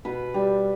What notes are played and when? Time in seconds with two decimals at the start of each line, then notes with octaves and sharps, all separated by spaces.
0.05 B2 B4
0.34 G3